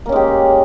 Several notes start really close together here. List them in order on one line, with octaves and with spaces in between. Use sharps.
A#3 C#4 G#3 G4